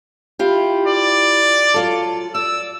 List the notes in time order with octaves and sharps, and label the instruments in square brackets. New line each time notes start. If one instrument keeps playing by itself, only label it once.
[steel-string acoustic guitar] E4 F4 G4
[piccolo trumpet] D5
[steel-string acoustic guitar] F#3 F4 A4
[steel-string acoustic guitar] D5 [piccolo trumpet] E6